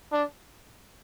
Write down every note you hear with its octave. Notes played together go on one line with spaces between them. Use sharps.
D4